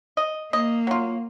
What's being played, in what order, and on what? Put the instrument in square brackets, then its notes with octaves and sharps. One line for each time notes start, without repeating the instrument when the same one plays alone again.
[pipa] D#5
[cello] A#3 [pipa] D#5
[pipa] F#3 F4